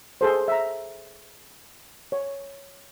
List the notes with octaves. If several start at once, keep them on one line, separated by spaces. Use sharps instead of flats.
G#4 A4 C5
E5 A#5
C#5